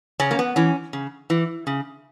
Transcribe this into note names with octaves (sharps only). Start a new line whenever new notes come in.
C#3 C#4
A#3
B3
E3 C#4
C#3
E3
C#3